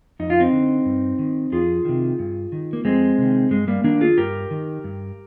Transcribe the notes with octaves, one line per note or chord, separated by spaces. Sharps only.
F2 D#4
F4
C4 D#4
D3
G2
D#3
F2 F4 G#4
C3 D#3
G2
D#3
A#3
F2 G#3 C4
C3 D#3
G2 G#3
G3 A#3
D#3 A#3 D4
F4 G#4
G2 G4 A#4
D#3
G2